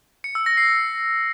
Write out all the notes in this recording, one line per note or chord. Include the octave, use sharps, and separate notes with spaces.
C#7
E6
A#6
C7